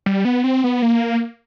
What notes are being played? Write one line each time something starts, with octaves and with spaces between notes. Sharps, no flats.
G3
B3
C4
B3
A#3